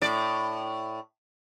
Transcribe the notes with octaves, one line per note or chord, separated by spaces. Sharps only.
A2 D5